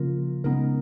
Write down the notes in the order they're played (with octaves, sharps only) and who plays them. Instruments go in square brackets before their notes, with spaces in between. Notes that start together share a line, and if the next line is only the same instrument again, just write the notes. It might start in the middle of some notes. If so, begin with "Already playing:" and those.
Already playing: [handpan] C#3 [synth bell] F3 A#3 F4 A#4
[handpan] C#3 [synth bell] G#3 B3 D#4 A#4